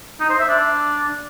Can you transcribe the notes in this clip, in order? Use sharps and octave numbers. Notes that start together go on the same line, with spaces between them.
D#4
C5
E5
D4